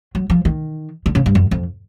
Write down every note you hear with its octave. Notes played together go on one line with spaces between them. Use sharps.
F#3
F3
D#3
D3
C#3
G2
F#2
F2